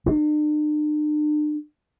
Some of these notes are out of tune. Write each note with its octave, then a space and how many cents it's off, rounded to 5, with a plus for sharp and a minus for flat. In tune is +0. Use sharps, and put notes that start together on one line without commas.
D4 +45